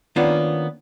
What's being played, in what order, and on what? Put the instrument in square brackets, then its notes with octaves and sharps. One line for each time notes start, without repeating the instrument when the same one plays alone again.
[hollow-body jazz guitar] D#3 A#3 B3 C#4 D4 F4